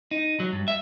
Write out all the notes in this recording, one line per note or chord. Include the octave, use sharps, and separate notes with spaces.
D#4
F#3
G2
E5